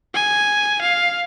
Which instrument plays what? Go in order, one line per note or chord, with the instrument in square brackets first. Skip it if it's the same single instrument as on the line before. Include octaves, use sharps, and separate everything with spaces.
[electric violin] G#5
F5